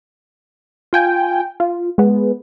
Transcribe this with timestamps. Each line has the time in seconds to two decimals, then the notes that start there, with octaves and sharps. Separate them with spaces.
0.93 F4 G5 G#5
1.60 F4
1.98 G#3 B3